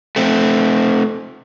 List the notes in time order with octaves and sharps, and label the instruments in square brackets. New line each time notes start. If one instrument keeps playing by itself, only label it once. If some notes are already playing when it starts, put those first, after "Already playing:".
[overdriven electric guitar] A3 C4